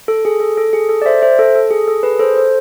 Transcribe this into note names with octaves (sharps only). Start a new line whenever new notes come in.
A4
G#4
A4
A4
G#4
A4
D5
C5 E5
C5 E5
A4
A4
G#4
A4
G#4 B4
A4 C5
A4 C5